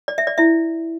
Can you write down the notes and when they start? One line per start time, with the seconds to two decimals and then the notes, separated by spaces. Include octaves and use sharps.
0.08 D5
0.18 E5
0.27 D5
0.38 E4 E5